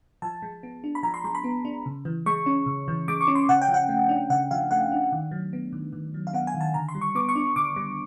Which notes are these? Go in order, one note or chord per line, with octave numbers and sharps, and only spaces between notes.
F3 A5
G#3
B3
D4
B5
F3 A#5
C6
G#3 C6
B5
B3
D4
C#3
E3
G#3 C#6
C#4
C#3
E3
G#3 D6
C#6
C#4
C6
C#3 F#5
G5
F3
F#5
A3
D4
C#3 F#5
F3 F5
A3 F#5
D4
D#3
F#3
B3
D#3
D#3
F#3
F5
B3 F#5
G#5
D#3
A5
D3 A#5
C6
G3
C#6
B3 D6
C#6
D4
D3 D6
G3